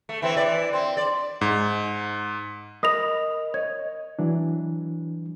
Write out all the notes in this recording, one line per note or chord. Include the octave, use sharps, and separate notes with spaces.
A3
E3 C4 E5
E3 D5
C4 C6
D5
G#2
A#4 D#5 B5 D#6 A#6 F7
C#5 D#5 G#6
E3 F#3 D4